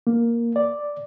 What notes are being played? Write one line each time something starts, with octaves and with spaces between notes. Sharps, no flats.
A#3
D5